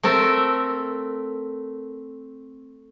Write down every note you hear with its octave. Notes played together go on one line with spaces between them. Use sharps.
A3 C4 A4 A#4